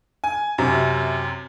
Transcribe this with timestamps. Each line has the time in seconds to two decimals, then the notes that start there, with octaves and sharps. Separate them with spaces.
0.24 G#5
0.58 F#2 C3